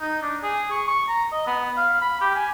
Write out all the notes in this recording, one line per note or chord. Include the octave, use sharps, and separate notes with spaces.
D#4
D4
G#4
C#6
C#6
A#5
D#5
B3
F5
B5
G4
G#5